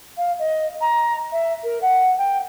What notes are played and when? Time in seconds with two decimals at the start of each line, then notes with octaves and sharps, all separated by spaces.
0.17 F5
0.38 D#5
0.80 A#5
1.31 E5
1.63 A#4
1.81 F#5
2.18 G5